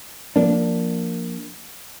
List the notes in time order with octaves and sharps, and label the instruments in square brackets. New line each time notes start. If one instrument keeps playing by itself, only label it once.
[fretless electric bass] F3 A#3 D4